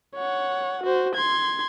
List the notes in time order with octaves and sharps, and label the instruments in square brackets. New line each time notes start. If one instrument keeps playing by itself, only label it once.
[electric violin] C#5 F#5
F#4 C5
C6 G#6